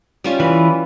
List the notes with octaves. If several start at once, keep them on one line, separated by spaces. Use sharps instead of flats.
G3 C#4 F4
E3 B4